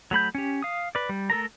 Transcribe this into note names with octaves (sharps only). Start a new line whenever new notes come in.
F#3 A3 B5 G6
C#4 G4
F5 D#6
B4 D5
G3
A3 A4 A#4 A#5